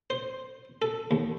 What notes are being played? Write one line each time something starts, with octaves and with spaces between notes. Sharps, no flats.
C5
A4
D#2